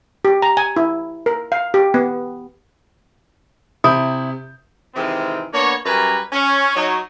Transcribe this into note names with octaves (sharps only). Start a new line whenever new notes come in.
G4
A#5
G#5
E4
A#4
F5
G4
B3
C3 E4 D#6 G6
C3 D#3 E3 G#3 C4
A#3 B3 D4 C#5
F#2 G3 A#4 B4 G#5 A#5
C#4
F#3 D#4 C#5